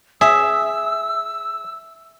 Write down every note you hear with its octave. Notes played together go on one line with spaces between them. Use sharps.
G#4 E5 E6